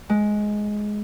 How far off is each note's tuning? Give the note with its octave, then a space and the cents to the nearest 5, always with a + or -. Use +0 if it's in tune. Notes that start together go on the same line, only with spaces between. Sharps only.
G#3 +10